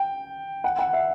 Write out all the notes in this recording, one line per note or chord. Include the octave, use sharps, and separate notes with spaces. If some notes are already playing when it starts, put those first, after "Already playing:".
Already playing: G5
F#5
F#5
E5